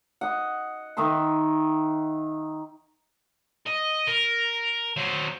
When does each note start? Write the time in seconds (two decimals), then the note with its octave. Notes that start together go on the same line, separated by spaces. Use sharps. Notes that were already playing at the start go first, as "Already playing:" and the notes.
0.21 D#5 F#5
0.97 D#3 D#4 E5 C6
3.66 D#5
4.07 A#4
4.97 F#3 C5